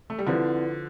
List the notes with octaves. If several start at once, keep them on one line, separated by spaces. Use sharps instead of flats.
A3
G3
D3 F3 C4 E4 B4 D5